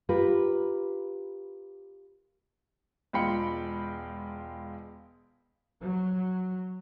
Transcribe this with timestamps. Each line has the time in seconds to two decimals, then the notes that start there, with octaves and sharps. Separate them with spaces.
0.09 F4 G4 A#4 B4
3.13 E1 G#3 F4 G5 B5 C#7
5.80 F#3